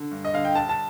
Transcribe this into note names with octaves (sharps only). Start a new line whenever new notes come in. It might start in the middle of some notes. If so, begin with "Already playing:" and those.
Already playing: D3
G2
D#5
D3 F5
G5
C2 A5
A5